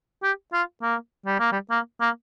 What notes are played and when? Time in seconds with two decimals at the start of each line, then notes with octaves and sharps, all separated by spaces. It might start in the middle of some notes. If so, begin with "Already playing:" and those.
0.23 G4
0.53 F4
0.82 A#3
1.26 G3
1.39 A#3
1.52 G3
1.70 A#3
2.01 A#3